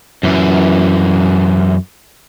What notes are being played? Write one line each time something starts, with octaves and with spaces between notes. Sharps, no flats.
F#2 E3